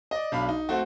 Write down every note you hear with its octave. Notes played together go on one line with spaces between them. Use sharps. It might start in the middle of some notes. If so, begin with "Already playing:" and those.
D5 D#5
B1 D4 F5 B5
D#4
A3 C4 F#4